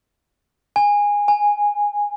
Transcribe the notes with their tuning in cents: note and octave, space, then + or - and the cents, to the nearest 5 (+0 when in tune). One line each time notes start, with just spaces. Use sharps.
G#5 -15
G#5 -5